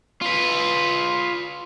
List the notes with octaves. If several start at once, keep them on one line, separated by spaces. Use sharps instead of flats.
F4 B4